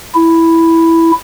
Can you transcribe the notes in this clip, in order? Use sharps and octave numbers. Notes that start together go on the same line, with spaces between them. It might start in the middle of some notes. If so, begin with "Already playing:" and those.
E4